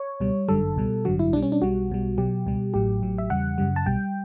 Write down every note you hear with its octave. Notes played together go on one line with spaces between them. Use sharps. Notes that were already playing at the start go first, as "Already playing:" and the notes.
Already playing: C#5
C#2 B2 G3
G1 F#2 D3 G3 A4
C#2 B2 G3
A1 G2 D3 F#3 F#4
E4
B1 B2 G3 D4
C#4
D4
B1 B2 G3 F#4
B1 B2 G3
B1 B2 F#3 G4
C#2 B2 G3
A1 A2 F#3 G4
A1 A2 F#3
E5
E2 C#3 G3 F#5
F#2 C#3 G3
A5
B1 B2 G3 G5